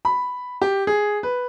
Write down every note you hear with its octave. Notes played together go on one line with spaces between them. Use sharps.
B5
G4
G#4
B4